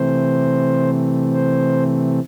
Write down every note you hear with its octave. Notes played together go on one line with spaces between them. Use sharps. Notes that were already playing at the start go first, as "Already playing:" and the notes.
Already playing: C3 E3 A3 C4 C5
C5